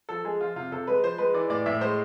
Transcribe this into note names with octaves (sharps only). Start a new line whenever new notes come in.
F3 A4
G#3 G#4
F3 F4
C3 F4
C3 A4
G#3 B4
F3 C5
G#3 B4
E3 D5
A2 D5
A2 E5
G#3 C5